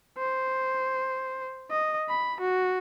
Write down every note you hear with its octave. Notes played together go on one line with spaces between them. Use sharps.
C5
D#5
B5
F#4